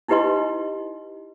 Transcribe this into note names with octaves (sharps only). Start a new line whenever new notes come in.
D#4 E4 G4 B4 D#5 C6